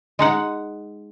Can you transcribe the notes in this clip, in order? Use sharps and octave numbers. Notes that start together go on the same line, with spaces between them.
G#3 D#4 F#5